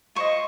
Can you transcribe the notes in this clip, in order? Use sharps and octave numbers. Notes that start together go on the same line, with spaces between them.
F4 C5 D#5 C#6